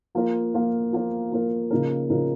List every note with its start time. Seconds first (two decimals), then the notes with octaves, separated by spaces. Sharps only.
0.15 F3 A#3 F4 A#4
0.54 F3 A#3 F4 A#4
0.92 F3 A#3 F4 A#4
1.31 F3 A#3 F4 A#4
1.71 C#3 F3 A#3 D#4 A#4
2.10 C#3 F3 A#3 D#4 A#4